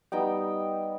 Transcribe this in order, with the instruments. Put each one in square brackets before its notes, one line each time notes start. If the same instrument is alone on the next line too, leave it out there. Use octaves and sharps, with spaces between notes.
[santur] G3 B3 D#4 G5